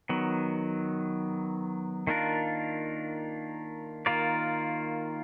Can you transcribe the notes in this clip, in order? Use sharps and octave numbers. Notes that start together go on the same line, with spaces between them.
D#3 F#3 B3
D#3 A#3 D4 F4 A#4
D#3 A#3 F4 A#4 D5